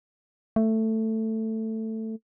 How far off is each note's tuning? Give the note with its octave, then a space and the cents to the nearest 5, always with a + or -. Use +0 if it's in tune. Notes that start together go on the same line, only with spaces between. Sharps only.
A3 +10